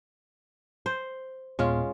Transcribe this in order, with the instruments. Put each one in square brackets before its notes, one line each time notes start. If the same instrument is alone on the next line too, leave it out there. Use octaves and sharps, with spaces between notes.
[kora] C5
[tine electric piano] D#2 A#2 B3 [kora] G#3 C#4 F4